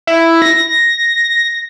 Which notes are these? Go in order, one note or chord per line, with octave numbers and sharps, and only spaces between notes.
E4
A#6